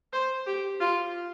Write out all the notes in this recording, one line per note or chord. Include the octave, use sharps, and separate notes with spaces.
C5
G4
F4